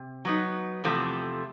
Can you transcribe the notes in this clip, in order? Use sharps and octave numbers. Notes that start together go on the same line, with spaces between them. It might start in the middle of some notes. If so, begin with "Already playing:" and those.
Already playing: C3
F#3 B3 D#4
E2 C3 F3 A3